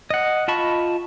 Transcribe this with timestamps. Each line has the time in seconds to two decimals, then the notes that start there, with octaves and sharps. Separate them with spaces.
0.10 D#5 F#5
0.48 F4 D#5 A5 B5 C#6